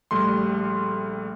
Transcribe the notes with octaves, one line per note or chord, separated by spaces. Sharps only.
A#1 G3 A3 C6